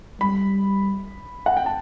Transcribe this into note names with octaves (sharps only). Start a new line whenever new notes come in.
G3 B5
F#5
G5
A5